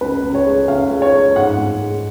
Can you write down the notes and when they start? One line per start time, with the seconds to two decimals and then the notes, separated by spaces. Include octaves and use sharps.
0.01 C#2 B4
0.23 C#2
0.35 C#5
0.46 G#3
0.68 C#2 F5
0.91 G#3
1.02 C#5
1.14 G#3
1.36 G#2 F#5
1.58 G#2
1.81 G#3